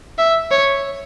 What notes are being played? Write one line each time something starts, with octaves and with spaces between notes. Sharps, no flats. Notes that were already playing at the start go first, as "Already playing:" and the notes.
E5
C#5